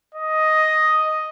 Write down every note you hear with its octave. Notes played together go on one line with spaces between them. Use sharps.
D#5